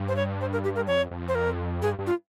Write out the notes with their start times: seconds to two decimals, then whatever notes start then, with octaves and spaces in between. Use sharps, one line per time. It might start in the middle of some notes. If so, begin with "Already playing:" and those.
Already playing: G2
0.08 C5
0.16 C#5
0.41 C5
0.52 A#4
0.64 G4
0.76 A#4
0.87 F2 C#5
1.11 F2
1.28 C5
1.35 A#4
1.82 G2 G#4
1.99 G2
2.07 F4